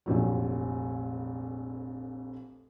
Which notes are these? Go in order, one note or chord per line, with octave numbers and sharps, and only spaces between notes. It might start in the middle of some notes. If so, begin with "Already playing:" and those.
F1 A#1 F2 F#3